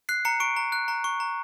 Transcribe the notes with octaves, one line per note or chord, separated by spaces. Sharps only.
F#6 C7
A#5 C#7
C#6 D7
A#5
F#6
A#5
C#6
A#5